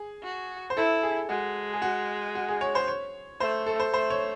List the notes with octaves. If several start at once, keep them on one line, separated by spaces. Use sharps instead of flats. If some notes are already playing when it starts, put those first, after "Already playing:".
Already playing: G#4
F#4
C5
E4 A4
G#4
G#3 F#4
G#4
F#4
F#4
G#4
C#5
C5
C#5
A3 C5
A4
C5
A3 C5
C#5